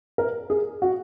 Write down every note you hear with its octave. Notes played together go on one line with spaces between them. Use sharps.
A#4
G#4
F#4